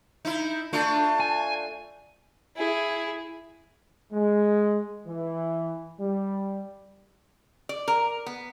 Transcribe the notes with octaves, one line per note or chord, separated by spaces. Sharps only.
D#4 E4
A3 D4 F4 A5
G#5
E4 G#4
G#3
E3
G3
D5
A#4
B3